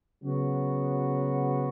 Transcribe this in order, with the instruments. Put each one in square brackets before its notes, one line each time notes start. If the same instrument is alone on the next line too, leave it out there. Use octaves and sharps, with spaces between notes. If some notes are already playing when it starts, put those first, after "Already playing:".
[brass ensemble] C#3 F#3 B3 F#4